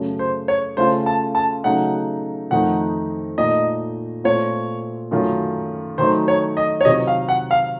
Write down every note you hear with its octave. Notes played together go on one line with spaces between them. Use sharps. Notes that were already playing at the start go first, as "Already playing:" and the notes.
Already playing: F#2 C#3 A3
C5
C#5
C#3 A3 C#4 F4 C5
A5
A5
C#3 F#3 A3 D#4 F#5
F2 D#3 A3 D#4 F#5
A#2 A3 D#4 D#5
A#2 A3 C4 F4 C#5
F#2 D#3 A3 C#4 F4
D#3 F#3 A3 D#4 C5
C#5
D#5
C#5
C3 D#3 F#3 C4 F4 D#5
F5
F#5
F5